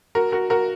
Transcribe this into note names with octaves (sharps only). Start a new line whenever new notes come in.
F#4 A#4
F#4 A#4
F#4 A#4